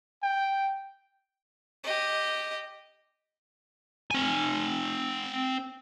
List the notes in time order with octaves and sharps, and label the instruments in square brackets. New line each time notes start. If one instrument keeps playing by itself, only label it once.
[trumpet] G5
[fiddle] G4 D#5
[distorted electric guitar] C4 G#5